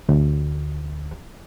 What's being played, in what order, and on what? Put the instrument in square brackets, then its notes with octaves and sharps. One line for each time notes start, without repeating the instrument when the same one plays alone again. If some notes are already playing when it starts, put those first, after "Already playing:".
[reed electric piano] D2